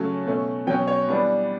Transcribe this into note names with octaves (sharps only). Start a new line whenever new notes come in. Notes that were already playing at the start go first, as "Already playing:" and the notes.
Already playing: C#3 F#3 A3 C#4 A5
B2 A3 C#4
B2 F#3 C#4 G5
C#5
E3 G3 B3 D4